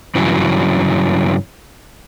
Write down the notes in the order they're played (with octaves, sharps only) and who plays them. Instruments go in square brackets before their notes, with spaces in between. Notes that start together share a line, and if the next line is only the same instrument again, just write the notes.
[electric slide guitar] G2 C#3 E3 F#3